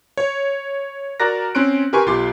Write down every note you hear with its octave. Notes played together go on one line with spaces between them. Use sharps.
C#5
F#4 A#4 D5 A#5 F#6 A#6
C4 C#4 C6 F#6 D7
G4 A#4 B4 G#5 C6 C#6
B1 F4 G4 C6 D6